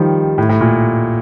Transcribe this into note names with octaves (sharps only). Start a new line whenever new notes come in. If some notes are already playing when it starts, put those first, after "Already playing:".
Already playing: D#3 F3 G3
A2
A2
A#2